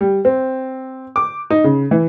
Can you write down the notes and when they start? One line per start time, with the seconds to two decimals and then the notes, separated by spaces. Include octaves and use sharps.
0.01 G3
0.25 C4
1.16 D6
1.50 D#4
1.64 C#3
1.91 E3